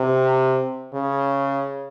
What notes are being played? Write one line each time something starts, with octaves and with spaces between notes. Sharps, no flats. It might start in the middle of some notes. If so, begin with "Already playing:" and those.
Already playing: C3
C#3